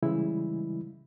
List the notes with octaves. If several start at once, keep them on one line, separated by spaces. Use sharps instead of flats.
C#3 E3 G3 G#3 E4